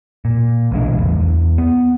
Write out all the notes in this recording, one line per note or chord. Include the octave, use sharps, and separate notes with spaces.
A#2
B1 E3 G#3 D4
E1 A1 E2
E2
B3